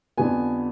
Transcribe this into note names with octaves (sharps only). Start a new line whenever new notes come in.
F2 D3 G3 B3 G#5